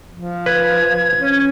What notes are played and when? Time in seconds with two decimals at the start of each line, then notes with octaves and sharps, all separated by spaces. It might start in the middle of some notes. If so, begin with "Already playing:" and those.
0.13 F3
0.46 B4 G#6
1.19 C#4